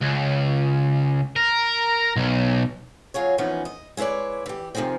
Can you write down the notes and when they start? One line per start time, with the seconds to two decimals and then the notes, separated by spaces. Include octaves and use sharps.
0.01 C#2
1.36 A#4
2.16 B1
3.14 F#3 F4 G#4 C#5
3.38 E3 F3 B3 C#4 D#4
3.65 D#5
3.97 G#3 E4 B4 C#5 D5
4.46 E3 G4
4.75 C3 D#3 F3 G#3 C4